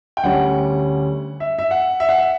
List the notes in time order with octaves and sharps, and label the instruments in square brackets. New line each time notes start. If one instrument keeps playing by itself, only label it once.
[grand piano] G5
D2 D3 G3 C#4 F#5
E5
E5
F#5
E5
F#5
E5